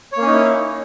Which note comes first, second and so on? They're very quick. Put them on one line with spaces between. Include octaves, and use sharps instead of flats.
C#5 A#3 C#4 D#4 E4